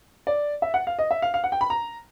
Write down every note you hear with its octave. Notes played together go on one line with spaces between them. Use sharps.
D5
E5
F#5
F5
D#5
E5
F5
F5
F#5
G5
B5
A#5